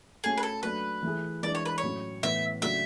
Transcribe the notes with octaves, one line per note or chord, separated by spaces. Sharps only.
A3 C#4 F#4 G#4 A4
B4
A4
F#3 A3 D4 B4
E3 A3 E4 G#4
E3 G#3 D4 D5
C#5
B4
C#5
A2 F#3 A3 C#4
A2 E3 B3 E4 B4 E5
C#3 F#3 A3 D4 F#4 E5